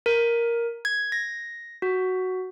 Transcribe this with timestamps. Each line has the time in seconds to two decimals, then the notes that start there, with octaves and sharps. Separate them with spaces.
0.06 A#4
0.85 G#6
1.12 A#6
1.82 F#4